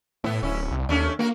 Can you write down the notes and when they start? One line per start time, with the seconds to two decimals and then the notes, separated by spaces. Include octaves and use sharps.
0.24 A2 B3 E4
0.43 D1 C#4 E4
0.71 C2
0.89 D#2 A3 C#4 D4
1.19 A#3 F#4 A#4